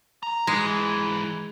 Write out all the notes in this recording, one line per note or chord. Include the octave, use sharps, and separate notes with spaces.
A#5
G#2 E3 G#3